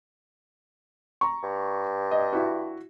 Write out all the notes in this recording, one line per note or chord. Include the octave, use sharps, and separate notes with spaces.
A#5 C#6
G2
D#5
E4 F#4